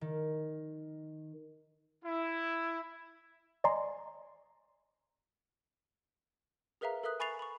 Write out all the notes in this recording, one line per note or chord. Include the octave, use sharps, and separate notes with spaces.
D#3
E4
D5 D#5 G#5 A#5 C6
G#4 A#4 B4 E5 F5 A#5
A4 A#4 E5 D#6 F#6
G#5 B5 C#6 A6 C7 F7
B5 C#6